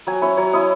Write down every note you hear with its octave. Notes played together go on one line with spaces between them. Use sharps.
F#3 G#5
C#4 E4 C#5
F#3 C#5
C#4 E4 D#5